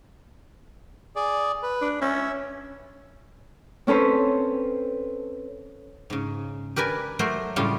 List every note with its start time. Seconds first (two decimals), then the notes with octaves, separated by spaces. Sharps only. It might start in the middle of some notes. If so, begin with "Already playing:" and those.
1.16 G#4 D5
1.63 B4
1.81 D4
2.01 C#4 E5
3.87 C4 C#4 A4 B4 C5
6.10 G#2 C#3
6.76 G4 A#4 B4 D5 G#5
7.19 F#3 A3 A#4 C5 D5
7.56 A2 C#3 G3 F4 G4